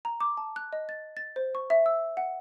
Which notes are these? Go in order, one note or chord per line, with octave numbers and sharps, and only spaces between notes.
A#5
D6
A5
F#6
D#5
A6
A6
C5
C#6
E5
E6
F#5